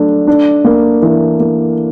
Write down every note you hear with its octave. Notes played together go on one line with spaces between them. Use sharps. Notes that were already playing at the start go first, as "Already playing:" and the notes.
Already playing: F#3 A3 D4
D4
A#3
E3
A#3